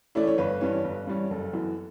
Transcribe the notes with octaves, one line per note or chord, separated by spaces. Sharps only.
E3 A3 C#4 E4 D5
C#5
G1 B4
G2 E3 G3 C#4
G1
G2 E3 G3 C#4
F#1 A4
F#2 E3 B3 E4